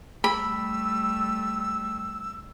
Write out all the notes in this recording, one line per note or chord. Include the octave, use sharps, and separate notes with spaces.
G3 A3 B5 E6